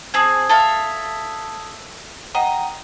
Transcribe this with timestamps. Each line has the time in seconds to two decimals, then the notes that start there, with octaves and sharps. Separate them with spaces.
0.14 C4 G#4 A5 D#6 G#6
0.49 A4 E5 F5
2.35 D#5 F#5 G5 A#5